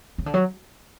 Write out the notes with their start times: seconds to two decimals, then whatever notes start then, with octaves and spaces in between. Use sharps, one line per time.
0.18 C#3
0.26 D3
0.34 F#3